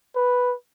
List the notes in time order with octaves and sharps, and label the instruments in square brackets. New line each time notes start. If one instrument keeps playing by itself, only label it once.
[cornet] B4